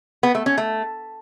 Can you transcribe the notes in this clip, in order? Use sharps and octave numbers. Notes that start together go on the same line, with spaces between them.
B3
A3
C#4
A3